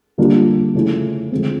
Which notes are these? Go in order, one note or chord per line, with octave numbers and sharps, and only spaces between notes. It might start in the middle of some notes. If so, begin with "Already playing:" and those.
D3 G3 A#3 D4 F4
C#3 F3 A3 C#4 E4
D3 F3 G#3 C4